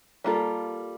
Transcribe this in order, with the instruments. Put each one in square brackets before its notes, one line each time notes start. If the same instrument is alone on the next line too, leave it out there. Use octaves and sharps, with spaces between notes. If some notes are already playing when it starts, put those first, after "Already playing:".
[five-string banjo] G3 A#3 F4 A4